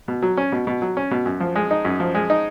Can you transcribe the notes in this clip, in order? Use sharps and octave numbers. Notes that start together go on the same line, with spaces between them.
B2
F#3
C#4
B2
B2
F#3
C#4
B2
F#2
F3
G#3
D#4
F#2
F3
G#3
D#4